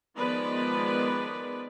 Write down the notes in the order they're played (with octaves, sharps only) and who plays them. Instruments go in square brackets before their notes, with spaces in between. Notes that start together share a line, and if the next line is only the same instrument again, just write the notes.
[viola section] D#3 F3 G#3 B3 B4 D5